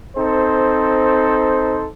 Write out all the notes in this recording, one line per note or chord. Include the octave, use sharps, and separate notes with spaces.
C4 D#4 A4 C5